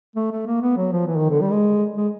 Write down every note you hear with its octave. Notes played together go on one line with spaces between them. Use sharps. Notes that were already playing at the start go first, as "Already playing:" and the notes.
A3
A3
A#3
B3
F#3
F3
E3
D#3
D3
G3
G#3
G#3